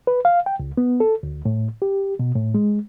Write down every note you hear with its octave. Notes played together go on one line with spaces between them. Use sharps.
B4
F5
G5
C#2
B3
A4
D2
A2
G4
B2
A2
G#3